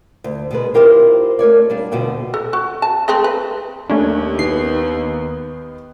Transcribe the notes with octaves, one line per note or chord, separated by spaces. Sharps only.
D2
B2 G#3 B4
C4 E4 F4 G4 A#4 C5
A3 A#4 C#5 D5
G3 D4 F4
D2 B2 D3 F#4 G5
A4
F#4
A5
G#3 A3 C4
B4
D#2 A3 C#4 D4
D#3 B3 C7